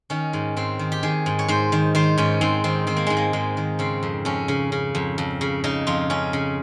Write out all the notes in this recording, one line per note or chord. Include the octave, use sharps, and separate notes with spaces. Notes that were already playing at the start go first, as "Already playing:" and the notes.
D#3 C#4
G#2
G#2 C4
D#3
G4
D#3 G#4
G#2
C#5
G#2 C5
D#3
D#3 C5
G#2 C#4
G#2 C4
D#3 C4
D#3 C4
A#3
G#2 G#3
A#3
G#2 G#3
D#3
C#3 C4
F2
F2 C#4
C#3
C#3
F2
F2
C#3
C#3 D#4
F2 F4
F2 C#4
C#3